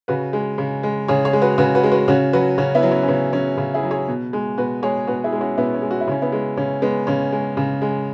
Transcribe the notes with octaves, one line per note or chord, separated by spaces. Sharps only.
C#3 F#4 B4
G#3
C#3
G#3
C#3 G#4 C#5
G#4 C#5
G#3
F#4 B4
C#3 F#4 B4
F#4 B4
G#3
F#4 B4
C#3 C#4 F#4
F#3 F#4 B4
C#3 C#4 F#4
B3 E4
F#3
C#4
C#4
C#3 B3
F#3 C#4
C#3
E4 G#4
F#3
G#4 C#5
B2
G#3
B2 F#4 B4
G#3 G#4 C#5
B2 F#4 B4
E4 G#4
G#3
C#4 F#4
B2 B3 E4
C#4
G#3
F#4
E4
C#3 C#4
B3 E4
G#3
C#3 C#4
G#3 B3
C#3 C#4
G#3
C#3
G#3